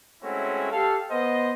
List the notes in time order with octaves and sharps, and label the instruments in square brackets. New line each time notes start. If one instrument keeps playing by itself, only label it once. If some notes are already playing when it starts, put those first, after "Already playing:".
[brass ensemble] G#3 A3 C4 C#4 E4 F#4
G4 A4 F5
B3 C5 D#5